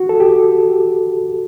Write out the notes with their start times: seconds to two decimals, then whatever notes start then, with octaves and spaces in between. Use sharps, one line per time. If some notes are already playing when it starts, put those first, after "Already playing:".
Already playing: F#4
0.09 A4
0.20 G4